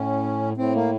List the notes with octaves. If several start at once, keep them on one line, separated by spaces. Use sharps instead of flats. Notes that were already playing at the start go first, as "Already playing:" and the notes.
Already playing: A2 C#4
A2 C4
A#3